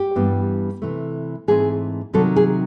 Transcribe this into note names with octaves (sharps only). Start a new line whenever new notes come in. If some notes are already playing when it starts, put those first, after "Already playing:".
Already playing: G4
G2 E3 G3 B3 D4
C3 E3 A3
G#2 E3 A3 C4 G#4
C3 D#3 F#3 A4
G#4